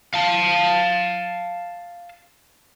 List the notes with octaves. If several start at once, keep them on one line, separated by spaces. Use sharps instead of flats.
F5 A5